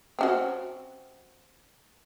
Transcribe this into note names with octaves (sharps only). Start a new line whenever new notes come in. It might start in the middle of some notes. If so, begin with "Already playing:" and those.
C4 C#4 F#4